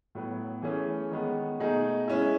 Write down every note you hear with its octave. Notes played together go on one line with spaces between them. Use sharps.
A2 F#3 B3
E3 A3 C#4 G#4
D#3 G#3 B3
B2 A3 D#4 G#4
G#3 C#4 E4